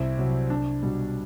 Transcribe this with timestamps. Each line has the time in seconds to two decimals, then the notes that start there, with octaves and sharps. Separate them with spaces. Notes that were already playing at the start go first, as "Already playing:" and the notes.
Already playing: C2 C4 E4
0.18 C3 F#3
0.50 C2 D4
0.83 B2 G3